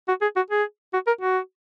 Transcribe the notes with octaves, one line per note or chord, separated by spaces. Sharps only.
F#4
G#4
F#4
G#4
F#4
A#4
F#4